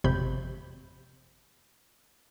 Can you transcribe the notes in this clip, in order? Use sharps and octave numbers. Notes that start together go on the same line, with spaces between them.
G#1 F2 C3 B5 G6